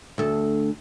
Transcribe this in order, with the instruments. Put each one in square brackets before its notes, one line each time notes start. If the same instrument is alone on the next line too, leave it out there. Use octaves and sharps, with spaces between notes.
[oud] D2 A4